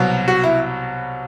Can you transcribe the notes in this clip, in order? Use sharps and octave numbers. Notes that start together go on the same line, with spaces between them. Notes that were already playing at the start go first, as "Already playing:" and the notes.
Already playing: C2 B2 F#3
F#4
E4